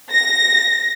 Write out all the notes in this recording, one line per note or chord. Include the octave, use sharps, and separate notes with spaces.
A#6